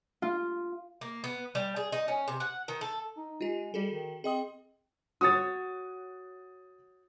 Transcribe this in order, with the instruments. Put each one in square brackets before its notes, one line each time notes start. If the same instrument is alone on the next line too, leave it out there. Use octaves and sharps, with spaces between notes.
[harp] F4
[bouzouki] A#3
B3
G3
G#4
D#4
C#4
C3
F#5
D#3
A4
[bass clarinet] D#4
[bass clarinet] G#3 [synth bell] F4 G4
[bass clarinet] G3 [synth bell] F#4 G#4 A4
[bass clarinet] D#3
[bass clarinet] C4 [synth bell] G#4 D#5 D#6
[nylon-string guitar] F#4 C#5 [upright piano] D#6 A6